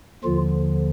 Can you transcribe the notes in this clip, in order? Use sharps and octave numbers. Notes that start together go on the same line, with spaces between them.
D#2 D3 F3 F4